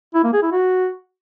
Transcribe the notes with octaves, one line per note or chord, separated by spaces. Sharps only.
E4
A#3
G#4
E4
F#4